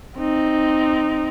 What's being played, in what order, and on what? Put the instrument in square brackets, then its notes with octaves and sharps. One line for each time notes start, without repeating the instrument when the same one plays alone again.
[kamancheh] C4 D#4